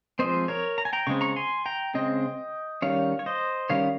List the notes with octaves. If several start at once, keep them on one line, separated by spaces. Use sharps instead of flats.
F3 G#3 C4 C5 D#5
A#4 C#5
A#5
G#5
G5 A#5
C#3 G#3 C4 C#6
A#5 C#6
G#5 C6
G5 A#5
C#3 G#3 C4 D#5 G5
D#3 G3 C#4 C#5 F5
C#5
C5 D#5
D#3 G3 C#4 C#5 F5